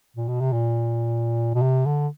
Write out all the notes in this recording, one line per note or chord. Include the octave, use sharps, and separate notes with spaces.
A#2
B2
C3
A#2
B2
C3
D3